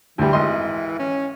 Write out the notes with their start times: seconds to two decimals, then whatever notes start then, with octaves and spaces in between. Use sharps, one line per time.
0.18 D2 E3 G3
0.33 G#1 D#5 C6
0.99 C#4